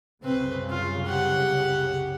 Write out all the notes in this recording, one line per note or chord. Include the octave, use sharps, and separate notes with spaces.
C2 F#2 C#3 C4 B4
F4
G4 F#5